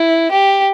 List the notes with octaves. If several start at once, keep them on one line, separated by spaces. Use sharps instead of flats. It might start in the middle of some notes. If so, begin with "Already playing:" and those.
Already playing: E4
G4